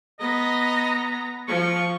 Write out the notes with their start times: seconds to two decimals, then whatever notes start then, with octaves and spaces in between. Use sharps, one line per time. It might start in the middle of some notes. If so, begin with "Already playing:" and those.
0.20 B3 D#5 A#5
1.48 F3 C#6